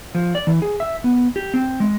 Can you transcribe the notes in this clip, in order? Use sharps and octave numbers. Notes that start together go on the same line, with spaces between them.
F3
D5
E3
G#4
E5
B3
G4
C4
G#3